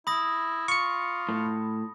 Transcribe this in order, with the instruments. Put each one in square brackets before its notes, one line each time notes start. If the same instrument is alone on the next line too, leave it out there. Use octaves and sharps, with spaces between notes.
[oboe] E4 [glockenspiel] B5 D#6 A#6
[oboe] F4 [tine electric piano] C#6 C#7
[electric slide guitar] A2